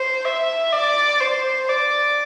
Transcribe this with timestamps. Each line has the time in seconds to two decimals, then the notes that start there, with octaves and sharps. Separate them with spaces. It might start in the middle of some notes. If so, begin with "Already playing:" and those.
Already playing: C5
0.25 E5
0.73 D5
1.20 C5
1.69 D5